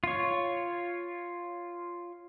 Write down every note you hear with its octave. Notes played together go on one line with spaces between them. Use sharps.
F4 C#5